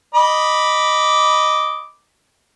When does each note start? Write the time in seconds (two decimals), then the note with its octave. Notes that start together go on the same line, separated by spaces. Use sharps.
0.15 D#5 B5 D6